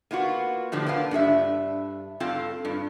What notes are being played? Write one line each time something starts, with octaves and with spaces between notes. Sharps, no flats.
A#3 B3 F4 F#4
A2 D3 F3 G3
A#3 B3 D4 F4
G2 D4 G#4 E5
G2 C4 F4 A4 F5
G2